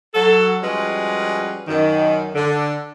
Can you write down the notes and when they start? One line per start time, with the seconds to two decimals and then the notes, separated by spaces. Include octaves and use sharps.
0.15 F#3 A4
0.63 F3 G3 G#3 C#4 F#4 B4
1.67 F#2 D#3
2.35 D3